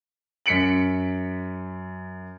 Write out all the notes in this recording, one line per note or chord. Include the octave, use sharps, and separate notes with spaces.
F#2 B6 C#7 D7 F#7